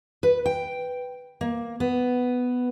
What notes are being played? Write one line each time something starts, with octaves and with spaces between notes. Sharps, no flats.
B4
G5
A#3
B3